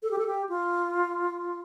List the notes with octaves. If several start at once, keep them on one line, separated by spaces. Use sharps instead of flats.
A4
G4
A4
G4
F4